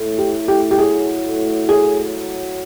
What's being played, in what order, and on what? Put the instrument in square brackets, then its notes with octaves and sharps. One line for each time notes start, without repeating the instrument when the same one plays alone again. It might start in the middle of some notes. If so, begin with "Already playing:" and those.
Already playing: [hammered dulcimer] A2
[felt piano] G4
[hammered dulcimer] A2
[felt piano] G4
G4
[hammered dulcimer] F#3 [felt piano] G#4
[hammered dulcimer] A2
[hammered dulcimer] A2 [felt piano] G#4
[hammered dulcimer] F#3